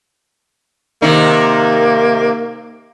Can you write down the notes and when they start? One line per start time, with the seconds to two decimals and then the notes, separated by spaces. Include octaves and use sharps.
1.02 C3 D#3 A#3 D#4